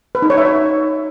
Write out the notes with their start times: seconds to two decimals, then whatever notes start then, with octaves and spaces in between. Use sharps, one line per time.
0.15 B4
0.22 D#4
0.30 C#5
0.38 E5
0.45 C#5